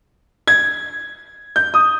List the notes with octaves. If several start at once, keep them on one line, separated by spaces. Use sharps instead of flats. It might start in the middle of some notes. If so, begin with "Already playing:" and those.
G#6
G6
D#6